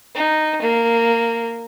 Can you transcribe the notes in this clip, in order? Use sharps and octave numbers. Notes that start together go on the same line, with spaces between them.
D#4
A#3